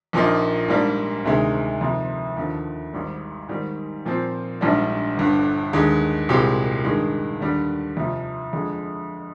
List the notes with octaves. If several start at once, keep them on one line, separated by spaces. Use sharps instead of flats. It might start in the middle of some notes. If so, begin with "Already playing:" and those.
A#1 A#2 F3 A#3 D#4
G#2 G3 A#3 D4
D2 C3 D#3 G#3
F2 C3 D#3
D#2 D3 F3
G#1 G#2 G3
G#2 D#3 G3
A#2 F3 C4
A#1 G#2 G3 D4
G1 G2 D3
D#2 D3 G#3
C2 A#2 G#3 C4 G4
G2 D#3 G#3
D#2 D3 G3 D4
F2 C3 F3
F2 D3 G#3